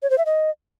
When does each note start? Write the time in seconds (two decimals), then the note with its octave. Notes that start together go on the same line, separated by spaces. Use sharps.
0.02 C#5
0.10 C5
0.18 E5
0.26 D#5